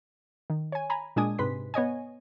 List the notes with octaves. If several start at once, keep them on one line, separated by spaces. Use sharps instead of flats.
D#3
C#5 G#5
G#5 A#5 B5
A#2 G#3 D4 G#5 D#6
G#2 C3 B4 C6 B6
B3 C#5 D#5 G#5